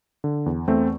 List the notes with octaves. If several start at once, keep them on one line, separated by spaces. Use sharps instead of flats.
D3
E2
E2 A3 C4